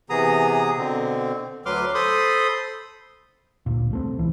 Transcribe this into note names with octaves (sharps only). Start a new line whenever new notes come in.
C3 E3 B3 G#4 A#5 D#6
B2 D3 C4
D2 F#3 B4 C6 D6 F6
A4 C5 B5 C6 D#6
G#1 D2 A#2
C2 A3 C4
G#1 C#2 E3